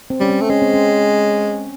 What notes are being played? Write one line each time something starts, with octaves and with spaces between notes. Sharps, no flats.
C4
G3 C#4
C4
A3
G#3 C#4
C4
C#4